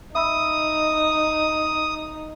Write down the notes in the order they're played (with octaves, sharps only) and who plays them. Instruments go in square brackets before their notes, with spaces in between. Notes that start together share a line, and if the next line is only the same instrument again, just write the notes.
[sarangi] D#4 [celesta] E5 B5 E6 [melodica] D#6